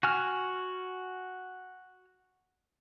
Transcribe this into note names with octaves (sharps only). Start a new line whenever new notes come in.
F#4 G#5 F6